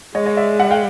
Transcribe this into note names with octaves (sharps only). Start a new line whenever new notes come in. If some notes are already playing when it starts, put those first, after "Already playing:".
G#3 C#5 D#5
C#5 D#5
D5 E5
E5 F#5
F5 G5